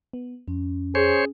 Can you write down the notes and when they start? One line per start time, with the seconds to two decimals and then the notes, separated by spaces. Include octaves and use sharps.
0.13 B3
0.48 F2 C#4
0.95 G#4 C5 C#5